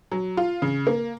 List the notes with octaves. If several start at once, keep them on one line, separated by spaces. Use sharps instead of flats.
F#3
F4
C#3
A#3